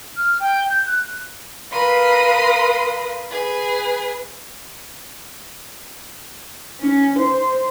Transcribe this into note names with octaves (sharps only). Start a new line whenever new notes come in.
F6
G5
G6
F#6
A#4 B4 F5 B5 C6 D#6
G#4 B4
C#4
C5